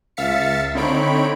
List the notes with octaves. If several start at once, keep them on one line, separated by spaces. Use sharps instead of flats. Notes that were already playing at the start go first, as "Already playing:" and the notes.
C#2 E5 F5 A6 B6 C#7
D3 C4 D#4 C#5 B5 D7